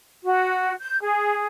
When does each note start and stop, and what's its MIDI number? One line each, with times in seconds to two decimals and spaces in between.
0.24 0.75 66
0.79 0.97 91
1.01 1.46 68